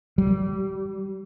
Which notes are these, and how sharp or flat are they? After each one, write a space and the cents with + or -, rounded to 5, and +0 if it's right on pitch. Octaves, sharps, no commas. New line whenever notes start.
G3 -30